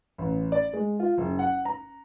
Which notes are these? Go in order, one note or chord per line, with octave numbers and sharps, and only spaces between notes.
A1
D5
G#3
F4
F#1
F#5
A#5